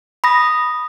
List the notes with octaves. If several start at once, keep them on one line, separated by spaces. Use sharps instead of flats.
B5 D#6 A#6